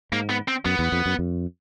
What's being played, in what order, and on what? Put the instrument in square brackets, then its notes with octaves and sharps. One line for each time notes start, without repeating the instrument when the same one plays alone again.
[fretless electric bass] G#2 [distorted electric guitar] A#3
[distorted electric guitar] B3
C4
[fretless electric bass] F#2 [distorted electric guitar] B3
[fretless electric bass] E2
F2
F#2
F2